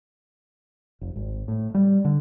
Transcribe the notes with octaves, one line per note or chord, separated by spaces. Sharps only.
F1
G#1
A2
G3
D3